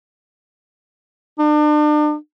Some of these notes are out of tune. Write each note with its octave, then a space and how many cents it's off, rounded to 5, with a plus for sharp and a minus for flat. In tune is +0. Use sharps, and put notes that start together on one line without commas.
D4 +40